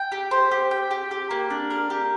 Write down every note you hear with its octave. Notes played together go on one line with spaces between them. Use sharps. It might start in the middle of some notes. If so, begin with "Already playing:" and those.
Already playing: G5
G4
C5
G4
G5
G4
G4
A#3
D4
A#4
G4